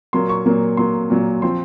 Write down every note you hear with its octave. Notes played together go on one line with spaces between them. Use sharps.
A#2 F#3 A#3 C6
C#6
A#2 F#3 A#3
A#2 F#3 A#3 C6
A#2 F#3 A#3
F3 C4 C6